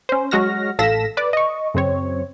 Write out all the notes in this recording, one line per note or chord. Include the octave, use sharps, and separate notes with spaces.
C#4 C5
F#3 G#3 F#4 F6 A#6
A1 A4 F5 A#6 B6 E7
B4 D5
D#5 C#6
F#2 C#3 C4 C#5